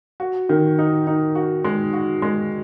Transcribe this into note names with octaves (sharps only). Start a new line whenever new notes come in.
F#4
D#3
D#4
D#4
F#4
G#3
F#4
G#3